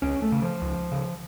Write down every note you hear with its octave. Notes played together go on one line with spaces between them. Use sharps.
C#2 C#4
A3
C#3
F3
C#2
C#3